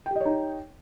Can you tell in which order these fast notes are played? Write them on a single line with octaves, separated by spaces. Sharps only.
G5 G4 D#5 C#5 D#4